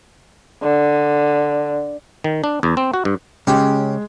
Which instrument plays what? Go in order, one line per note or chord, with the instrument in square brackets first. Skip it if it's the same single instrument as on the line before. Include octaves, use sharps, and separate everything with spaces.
[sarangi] D3
[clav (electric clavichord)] D#3
D4
E2
C4
F#4
G2
[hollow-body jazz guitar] C#3 C#4 [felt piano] G#3 [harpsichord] G4